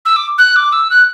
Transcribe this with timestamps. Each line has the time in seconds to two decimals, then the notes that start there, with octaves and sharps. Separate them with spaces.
0.05 E6
0.16 D6
0.38 F#6
0.56 D6
0.72 E6
0.90 F#6